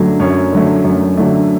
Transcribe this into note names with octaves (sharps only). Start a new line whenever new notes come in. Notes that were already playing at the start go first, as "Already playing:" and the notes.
Already playing: F#2 D3 F#3 A3
F#2 C#5
D3 F#3 A3
F#2
D3 F#3 A3